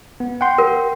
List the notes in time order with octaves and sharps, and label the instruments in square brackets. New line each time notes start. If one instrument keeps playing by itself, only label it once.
[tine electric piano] B3
F#5 G5 C6
[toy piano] A#4